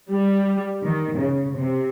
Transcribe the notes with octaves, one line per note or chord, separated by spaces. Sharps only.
G3
D#3
C#3
C3